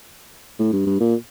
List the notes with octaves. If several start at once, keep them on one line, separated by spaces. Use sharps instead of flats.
A2
G2
G2
A#2